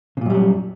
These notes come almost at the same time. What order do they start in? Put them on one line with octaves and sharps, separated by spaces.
C#3 A#2 F#2 G3 F#3